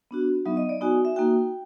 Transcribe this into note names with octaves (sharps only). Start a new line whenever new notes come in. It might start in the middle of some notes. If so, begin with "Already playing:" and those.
B3 D4 F#4
F#3 B3 D#4 E5
D#5
D5
B3 D#4 F#4 G#5
E5
A#3 D#4 F#4 G5